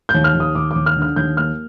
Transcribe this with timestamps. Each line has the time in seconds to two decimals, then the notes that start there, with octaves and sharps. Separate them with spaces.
0.09 G6
0.14 D#2
0.24 F6
0.35 D#2
0.40 D#6
0.55 D#2 D6
0.71 D#2 D6
0.86 F6
0.96 D3
1.02 F6
1.16 D#2 G6
1.37 A#3 F6